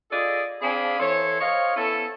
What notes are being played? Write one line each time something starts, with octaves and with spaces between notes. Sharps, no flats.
F4 G#4 A4 D5 D#5
C4 D4 G#4 F5 G#5 B5
E3 A4 C5 C#5
C5 C#5 D#5 F5
B3 C#4 E4 A4